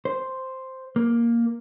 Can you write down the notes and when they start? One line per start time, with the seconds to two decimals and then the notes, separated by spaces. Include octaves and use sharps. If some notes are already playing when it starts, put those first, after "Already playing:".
0.05 C5
0.96 A#3